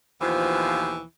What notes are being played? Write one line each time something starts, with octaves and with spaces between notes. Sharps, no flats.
D#2 B2 E3 F3